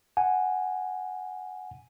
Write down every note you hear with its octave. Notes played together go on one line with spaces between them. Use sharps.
F#5 G#5